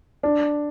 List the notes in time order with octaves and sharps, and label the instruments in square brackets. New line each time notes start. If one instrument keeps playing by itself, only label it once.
[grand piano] D4